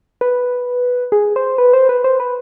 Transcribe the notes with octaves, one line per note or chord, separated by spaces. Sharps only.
B4
G#4
C5
B4
C5
B4
C5
B4